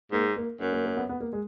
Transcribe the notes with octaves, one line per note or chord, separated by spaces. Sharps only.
G#2 A#3
A#3
F#2 A#3
A#3
A#3
B3
B3
A#3
G#3